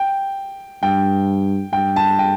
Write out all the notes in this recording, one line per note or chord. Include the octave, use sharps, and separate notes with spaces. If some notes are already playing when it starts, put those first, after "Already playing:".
Already playing: G5
G2 G5
G2 G5
A5
G5